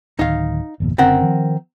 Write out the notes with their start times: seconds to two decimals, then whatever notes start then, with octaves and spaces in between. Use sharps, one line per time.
0.19 D1 D#3 D#4 F5
0.80 G1 E2 A#2
0.98 F#1 D3 C4 C#4 A#4 F#5
1.22 D#3 F3